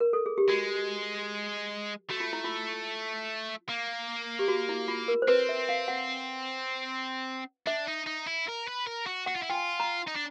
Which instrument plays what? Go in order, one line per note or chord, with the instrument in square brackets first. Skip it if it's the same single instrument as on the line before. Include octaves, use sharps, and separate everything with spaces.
[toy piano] A#4
A4
G#4
G4
[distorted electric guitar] G#3 [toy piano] F#4
[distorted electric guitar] A3 [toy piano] F#4
[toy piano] F4
E4
F4
[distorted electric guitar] A#3
[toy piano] G4
F#4
E4
F4
A#4
C5
[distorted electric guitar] C4 [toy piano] B4
[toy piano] E5
F5
F#5
[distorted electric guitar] D4 [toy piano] E5
[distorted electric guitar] D#4
D#4
E4
A#4
B4
A#4
F#4
[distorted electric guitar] F#4 [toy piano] F#5
[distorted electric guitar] F4
E4
[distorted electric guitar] F4 [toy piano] G5 G#5
[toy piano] A#5
[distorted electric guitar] D#4
D4